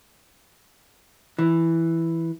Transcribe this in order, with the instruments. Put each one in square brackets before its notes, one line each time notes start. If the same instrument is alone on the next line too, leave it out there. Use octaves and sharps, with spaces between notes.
[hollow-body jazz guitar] E3